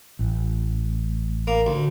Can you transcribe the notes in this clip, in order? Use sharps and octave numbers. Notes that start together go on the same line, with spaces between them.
A1
A#3
D2